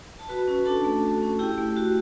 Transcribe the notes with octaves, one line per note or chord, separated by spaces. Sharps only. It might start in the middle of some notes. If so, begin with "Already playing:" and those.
A5
F#4 B4 B5
C#4
D4 A4 A5
A3
F#4
C#4
E4 G4 G5
A3
F#4